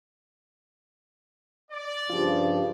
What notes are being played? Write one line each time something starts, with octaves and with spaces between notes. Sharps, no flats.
D5
G2 C#3 F3 F4 G4